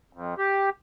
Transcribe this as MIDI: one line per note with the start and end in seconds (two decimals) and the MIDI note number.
0.13 0.34 41
0.38 0.70 67